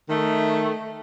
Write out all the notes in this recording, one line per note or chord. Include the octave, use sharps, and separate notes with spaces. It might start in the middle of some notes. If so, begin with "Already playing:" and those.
D#3 A3